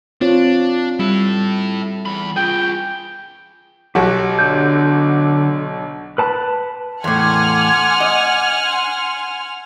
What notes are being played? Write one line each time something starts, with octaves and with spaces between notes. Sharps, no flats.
C4 D4 F4 C#5
G3 E4 A4
E2 B5
F4 G#4 G5
B1 F#4 G4
D3 G6
B4 A5 B5
E2 A2 F#5 G#5 C6 D6 F6 G#6
D#5
C6